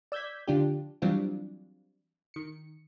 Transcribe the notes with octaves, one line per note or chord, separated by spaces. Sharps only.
D5 E6 G6 G#6 B6
D3 F3 D4 F4 G4
E3 F#3 G3 C4 D4 F4
D#3 C#7